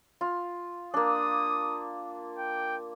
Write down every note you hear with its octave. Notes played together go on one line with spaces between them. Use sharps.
F4
A#3 D4 D#6
G5